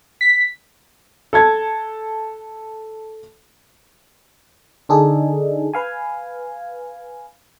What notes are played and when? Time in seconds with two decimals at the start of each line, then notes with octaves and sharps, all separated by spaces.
0.21 B6
1.33 A4 A5 G#6
4.89 D3 D4 D#4 G#4 A4
5.74 B4 F5 G#5